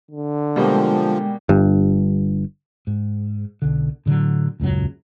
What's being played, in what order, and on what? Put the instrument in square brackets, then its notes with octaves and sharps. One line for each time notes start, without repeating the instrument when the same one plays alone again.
[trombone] D3
[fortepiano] B2 G3 A#3 [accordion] F3 [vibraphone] G#3 G5
[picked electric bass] G1 G2
[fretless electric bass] G#2
B1 D3
A2 D3 F3 F#3
D#1 C#2 F#2 F#3